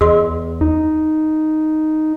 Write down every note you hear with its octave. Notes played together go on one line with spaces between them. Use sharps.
E2 G#4 D#5 C6
D#4